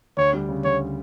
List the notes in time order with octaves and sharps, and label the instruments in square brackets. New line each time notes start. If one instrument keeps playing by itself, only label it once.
[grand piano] D2 [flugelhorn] C#5
[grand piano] G3
C#3
[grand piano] D2 [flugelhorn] C#5